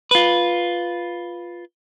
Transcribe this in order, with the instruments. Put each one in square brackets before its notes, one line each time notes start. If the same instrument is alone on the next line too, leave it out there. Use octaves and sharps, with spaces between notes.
[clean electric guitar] F4 B4